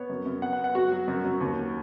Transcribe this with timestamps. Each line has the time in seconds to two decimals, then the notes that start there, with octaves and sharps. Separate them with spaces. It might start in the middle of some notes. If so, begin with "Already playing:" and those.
Already playing: B3 C#5
0.09 F#2
0.26 F#2
0.42 B3 F#5
0.53 F#5
0.59 B3
0.64 F#5
0.75 F#3 F#4
0.92 F#3
1.08 F#2
1.25 F#2
1.41 D#2